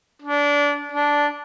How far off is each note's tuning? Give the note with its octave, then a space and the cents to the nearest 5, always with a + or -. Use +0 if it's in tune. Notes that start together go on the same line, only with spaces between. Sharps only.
D4 -25
D4 -10